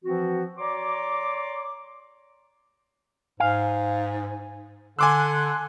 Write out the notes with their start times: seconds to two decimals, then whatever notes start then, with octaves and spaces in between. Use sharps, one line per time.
0.05 E3 F3 C4 F#4
0.58 C#5 D5 A#5 C6 D6
3.40 G#2 F5 G#5
4.99 D3 G#5 C6 D6 E6 F#6